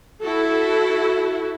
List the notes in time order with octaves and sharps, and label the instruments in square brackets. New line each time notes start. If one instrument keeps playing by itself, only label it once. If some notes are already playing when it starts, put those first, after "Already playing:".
[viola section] E4 F#4 A4